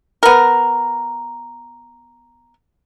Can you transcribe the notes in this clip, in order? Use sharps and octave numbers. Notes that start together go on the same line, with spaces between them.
B3 A#4